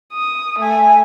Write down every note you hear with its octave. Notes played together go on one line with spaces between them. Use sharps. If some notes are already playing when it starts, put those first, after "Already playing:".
D#6
A3 G#5